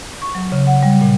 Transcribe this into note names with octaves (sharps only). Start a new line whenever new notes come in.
C#6
F#3
C#3
F#5
G3
A#2